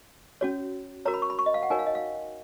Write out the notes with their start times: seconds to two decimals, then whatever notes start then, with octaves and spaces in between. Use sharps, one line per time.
0.41 C#4 F#4 C#5
1.06 F#4 A#4 C#5 A#5
1.14 B5
1.22 C#6
1.30 B5
1.39 C#6
1.46 D#5
1.54 F5
1.63 F#5
1.70 D#4 F#4 A#4 C#5 G#5
1.79 F5
1.87 D#5
1.95 F5